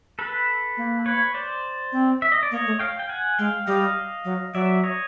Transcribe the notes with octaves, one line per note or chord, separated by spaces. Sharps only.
A4 B4
A#3
B4 C#5
C5 D5
C4
E5
D#5
D5
A#3 C#5 D#5
A3
F5 G5
G5
F#5 G#5
G#3 F5 G5
G3 D#5 F5
F#3
F#3 D5 E5
C#5 D#5